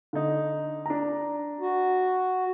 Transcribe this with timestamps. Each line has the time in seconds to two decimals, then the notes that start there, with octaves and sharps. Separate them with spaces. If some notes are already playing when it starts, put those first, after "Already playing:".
0.13 D3 D#4
0.86 D4 A#5
1.61 F#4